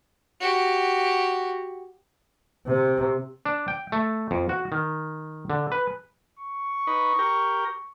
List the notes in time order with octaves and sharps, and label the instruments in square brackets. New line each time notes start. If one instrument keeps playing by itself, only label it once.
[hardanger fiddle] F#4 G4
[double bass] C3
[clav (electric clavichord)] D4
G5
A3
F2
F#4
D#3
D3
B4
[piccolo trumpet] C#6
[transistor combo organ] D#4 B4
G4 A#4